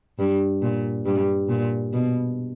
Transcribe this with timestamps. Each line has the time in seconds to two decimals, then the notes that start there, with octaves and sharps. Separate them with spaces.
0.19 G2
0.62 A#2
1.06 G2
1.49 A#2
1.93 B2